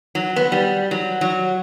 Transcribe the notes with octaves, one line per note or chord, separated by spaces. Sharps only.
F#3
B3
G3
F#3
F#3